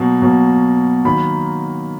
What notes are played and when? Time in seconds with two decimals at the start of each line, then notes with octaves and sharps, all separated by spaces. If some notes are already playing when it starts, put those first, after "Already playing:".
Already playing: B2 F#3 A#3
0.22 B2 F#3 A#3
1.05 D#3 F#3 A#3 B5